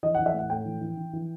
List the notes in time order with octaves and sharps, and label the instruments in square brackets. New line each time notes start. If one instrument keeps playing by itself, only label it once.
[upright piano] E3 D#5
E3 F#5
E5
A2 F#5
A2 G5
E3
E3
E3
E3